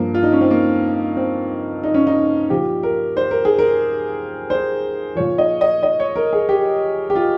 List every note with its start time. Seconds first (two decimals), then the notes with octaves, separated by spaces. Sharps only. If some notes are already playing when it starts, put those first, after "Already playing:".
Already playing: G2 F3 A#3
0.14 F4
0.23 D#4
0.32 C#4
0.41 C4
0.51 A#3
1.17 C4
1.84 D#4
1.94 C#4
2.07 D#4
2.50 A#2 F3 G4
2.83 A#4
3.17 C5
3.31 A#4
3.45 G#4
3.59 A#4
4.50 C5
5.16 A#2 F3 C#5
5.38 D#5
5.61 D#5
5.83 D#5
6.00 C#5
6.16 A#4
6.33 G#4
6.49 G4
7.10 G4
7.16 F4